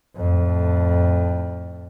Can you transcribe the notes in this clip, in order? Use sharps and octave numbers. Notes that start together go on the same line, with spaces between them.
F2 A2